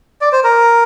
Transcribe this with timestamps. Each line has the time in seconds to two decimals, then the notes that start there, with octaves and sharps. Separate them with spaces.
0.21 D5
0.32 C5
0.44 A#4